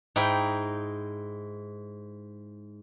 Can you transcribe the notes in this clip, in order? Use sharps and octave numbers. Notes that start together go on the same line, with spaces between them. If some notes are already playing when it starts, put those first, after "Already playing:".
G#2 D#4 E4 G5